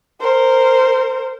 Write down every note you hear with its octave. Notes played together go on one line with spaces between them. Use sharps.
A#4 C5